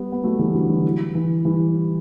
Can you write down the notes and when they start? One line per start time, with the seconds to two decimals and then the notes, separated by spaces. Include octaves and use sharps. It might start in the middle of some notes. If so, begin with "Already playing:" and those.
Already playing: G3 B3
0.12 B3
0.23 F#3 A3
0.39 E3 G3
0.54 D3 F#3
0.69 E3
1.15 E3
1.45 E3 G3